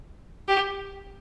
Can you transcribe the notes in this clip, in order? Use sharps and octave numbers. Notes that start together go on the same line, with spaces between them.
G4